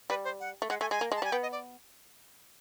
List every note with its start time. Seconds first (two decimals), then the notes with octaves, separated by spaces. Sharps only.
0.10 G3 B4
0.24 C5
0.40 F#5
0.62 A3
0.70 G#3 F#5
0.81 A3 G#5
0.91 G#3 G#5
1.01 A#3
1.12 G#3
1.16 A5
1.22 G3 G#5
1.32 B3 G5
1.42 D#5
1.52 D5